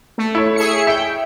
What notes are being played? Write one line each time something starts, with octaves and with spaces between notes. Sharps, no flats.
A3
E4 C#5
G#4 E5 C#7
E5 G5